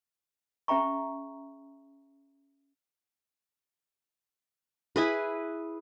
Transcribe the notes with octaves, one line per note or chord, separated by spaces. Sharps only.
C#4 G#4 E5 G5 A#5 C#6
E4 G#4 B4